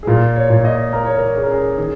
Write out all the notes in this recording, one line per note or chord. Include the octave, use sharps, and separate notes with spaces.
G#4
A#2 F4
C#5
A#2
D#5
A#3 A#4
C#5
A#4
C#4 G#4
A#4
G#4
D#3 G#4